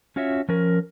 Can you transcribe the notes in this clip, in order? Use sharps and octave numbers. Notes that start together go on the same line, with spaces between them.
C#4 F4 F#4 C#5 E5
F3 C#4 A#4